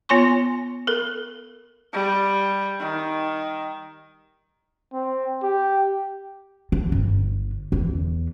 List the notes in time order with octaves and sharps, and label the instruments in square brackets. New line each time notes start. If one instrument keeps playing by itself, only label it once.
[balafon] B3 F4 C#5 G#5 C6 C#6
A4 A#4
[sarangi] G3
D#3
[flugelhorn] C4
G4
[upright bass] D3
G1
E2